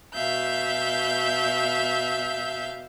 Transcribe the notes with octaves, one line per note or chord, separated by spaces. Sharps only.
B2 E5 F5 G6